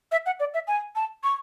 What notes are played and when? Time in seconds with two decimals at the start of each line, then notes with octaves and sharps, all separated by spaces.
0.12 E5
0.26 F#5
0.40 D5
0.54 E5
0.68 G#5
0.96 A5
1.24 C#6